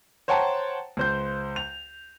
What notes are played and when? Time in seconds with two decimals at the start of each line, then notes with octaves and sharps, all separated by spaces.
0.28 C5 C#5 F#5 G5 A5 A#5
0.97 C#2 C5 G6
1.56 F7